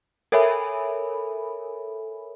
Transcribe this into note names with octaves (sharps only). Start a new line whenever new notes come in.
A4 A#4 C#5 E5 G#5 B5